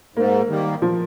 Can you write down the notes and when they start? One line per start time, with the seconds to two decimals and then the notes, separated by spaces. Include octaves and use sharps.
0.16 G#2 A#3
0.49 D#3 G3 A#3
0.82 F3